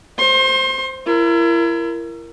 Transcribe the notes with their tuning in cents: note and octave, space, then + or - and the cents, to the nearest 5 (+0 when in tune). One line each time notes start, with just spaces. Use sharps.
C5 +0 C6 +35
E4 +35 A#4 +0